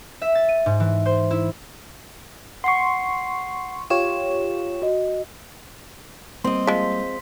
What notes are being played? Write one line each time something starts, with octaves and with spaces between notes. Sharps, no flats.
E5
A6
D#7
G#2
E3
C5
E4
F#5 C6 C#6 C7
F4 G4 C#5 E7
F#4 D#5
G3 A#3 C4 D#5 C6
F3 G#3 B6